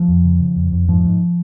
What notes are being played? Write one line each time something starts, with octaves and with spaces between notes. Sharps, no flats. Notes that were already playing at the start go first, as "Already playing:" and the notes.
Already playing: F3
F2
C#3
C#3
F2
F2
G#2 F3
G#2